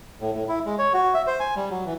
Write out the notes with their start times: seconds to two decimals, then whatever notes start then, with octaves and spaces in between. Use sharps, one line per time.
0.21 A2
0.34 A2
0.48 E4
0.65 G#3
0.79 C#5
0.94 F#4
1.14 E5
1.27 C5
1.40 G#5
1.56 G3
1.70 F#3
1.85 E3